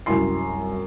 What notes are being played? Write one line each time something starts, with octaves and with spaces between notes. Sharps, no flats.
C2 F#2 E4 C6 C7